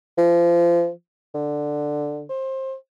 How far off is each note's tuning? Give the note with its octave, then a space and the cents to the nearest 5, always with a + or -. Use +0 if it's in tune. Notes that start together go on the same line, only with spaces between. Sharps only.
F3 -30
D3 +5
C5 +25